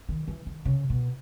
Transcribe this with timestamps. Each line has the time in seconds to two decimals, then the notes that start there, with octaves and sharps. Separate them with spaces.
0.09 D#3
0.28 E3
0.46 D#3
0.65 C#3
0.90 B2